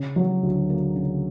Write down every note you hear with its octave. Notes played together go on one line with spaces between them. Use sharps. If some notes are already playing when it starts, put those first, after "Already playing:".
Already playing: C#3
F#3
D2
A#3
C#3